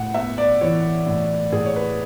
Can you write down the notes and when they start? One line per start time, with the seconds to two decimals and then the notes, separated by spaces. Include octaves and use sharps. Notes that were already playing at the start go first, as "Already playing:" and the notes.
Already playing: A2 F#5
0.14 B3 E5
0.38 D5
0.61 E3 C#5
1.07 A2
1.52 A2 G#4
1.65 C#5
1.76 B4